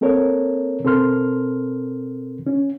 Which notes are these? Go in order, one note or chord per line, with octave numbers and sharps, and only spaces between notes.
A#3 C4 A4 A#4 C#5
B2 C4 A4 A#4 C6 F6
C#4